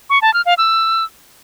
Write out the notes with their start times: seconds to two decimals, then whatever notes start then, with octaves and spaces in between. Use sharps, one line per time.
0.10 C#6
0.22 A5
0.34 F6
0.46 F5
0.58 E6